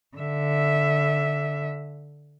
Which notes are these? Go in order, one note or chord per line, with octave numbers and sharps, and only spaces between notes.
D3 E5